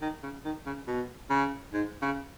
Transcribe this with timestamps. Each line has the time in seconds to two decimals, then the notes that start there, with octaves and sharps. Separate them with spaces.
0.02 D#3
0.23 C#3
0.45 D#3
0.66 C#3
0.87 B2
1.30 C#3
1.73 G#2
2.02 C#3